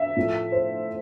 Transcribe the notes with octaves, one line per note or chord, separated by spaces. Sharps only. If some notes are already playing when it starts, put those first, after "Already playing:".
Already playing: E5
A2 F3 A3
C5